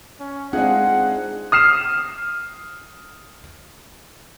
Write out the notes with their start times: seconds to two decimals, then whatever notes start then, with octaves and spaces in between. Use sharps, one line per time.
0.20 C#4
0.53 G#3 C4 D4 D#4 F4 G#4 F#5
1.52 D#6 F6 C7 E7